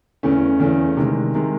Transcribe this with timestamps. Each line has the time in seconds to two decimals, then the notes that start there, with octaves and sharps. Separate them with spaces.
0.23 E2 C#3 E3 A3 C#4
0.60 E2 C#3 E3 A3 C#4
0.97 C3 D#3 G#3
1.35 C3 D#3 G#3